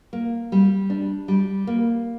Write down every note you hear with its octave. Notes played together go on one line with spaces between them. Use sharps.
A#3
G3
D4
G3
A#3